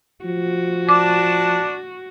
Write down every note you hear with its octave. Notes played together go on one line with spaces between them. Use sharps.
F3 F#4
D4 A5 D6